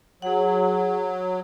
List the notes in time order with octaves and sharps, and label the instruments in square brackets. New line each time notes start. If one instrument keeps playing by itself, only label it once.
[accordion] F#3 [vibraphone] G#4 F#5